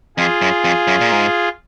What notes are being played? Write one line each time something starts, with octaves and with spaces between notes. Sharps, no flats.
F2 F4 G#4
F#2
F2
F#2
A#2
G#2